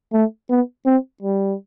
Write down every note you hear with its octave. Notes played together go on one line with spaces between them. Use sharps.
A3
B3
C4
G3